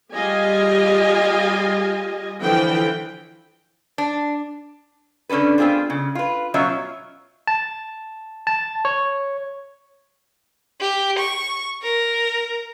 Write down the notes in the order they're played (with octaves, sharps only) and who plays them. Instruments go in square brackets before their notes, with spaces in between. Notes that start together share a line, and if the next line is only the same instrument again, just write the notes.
[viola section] G3 F4 G4 G#4 D#5 G#5
D3 E3 F3 A4 G5
[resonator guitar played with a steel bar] D4
D3 C#4 D4 A4 B4
B3 C4 F4 G#4 C5
C#3
F4 B4
B2 F#3 C#4 F4 C#5 E5
[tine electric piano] A5
A5
C#5
[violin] G4
C#6
A#4